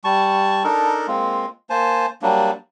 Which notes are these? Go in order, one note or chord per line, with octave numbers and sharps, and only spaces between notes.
G3 A5 C#6
D4 D#4 A4 A#4
G#3 A#3 C4 F4
A#3 C5 G#5 A5
F#3 G3 A#3 D4